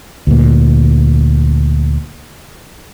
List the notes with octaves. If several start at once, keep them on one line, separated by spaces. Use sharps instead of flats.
D2 A#2